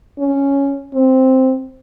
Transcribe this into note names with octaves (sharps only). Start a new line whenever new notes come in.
C#4
C4